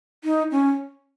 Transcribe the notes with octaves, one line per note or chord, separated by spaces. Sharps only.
D#4
C#4